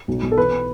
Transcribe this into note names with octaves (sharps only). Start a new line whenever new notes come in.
B1
B1
A4
E3 B4